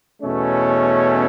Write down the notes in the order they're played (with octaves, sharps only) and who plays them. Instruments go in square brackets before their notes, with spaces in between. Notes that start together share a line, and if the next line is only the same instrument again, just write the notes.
[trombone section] E2 B2 A3 C#4